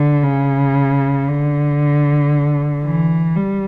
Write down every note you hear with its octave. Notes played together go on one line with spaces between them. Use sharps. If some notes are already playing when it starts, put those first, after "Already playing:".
Already playing: D3
C#3
D3
E3
G3